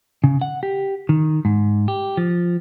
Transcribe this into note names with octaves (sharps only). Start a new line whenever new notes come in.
C#3
F#5
G4
D#3
G#2
G4
F3